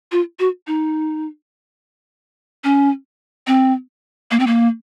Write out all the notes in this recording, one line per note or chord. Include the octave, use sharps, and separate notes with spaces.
F4
F#4
D#4
C#4
C4
A#3
C4
A#3